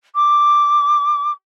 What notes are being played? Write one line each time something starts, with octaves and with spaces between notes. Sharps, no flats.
D6